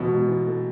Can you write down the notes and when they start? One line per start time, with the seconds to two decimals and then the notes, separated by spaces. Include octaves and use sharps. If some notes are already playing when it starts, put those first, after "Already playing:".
Already playing: A1 B2 E3 A3
0.09 G#2
0.27 E3
0.46 A3